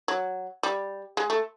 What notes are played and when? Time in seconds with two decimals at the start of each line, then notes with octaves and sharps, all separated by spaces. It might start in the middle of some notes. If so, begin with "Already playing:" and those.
0.08 F#3
0.63 G3
1.17 G#3
1.30 A3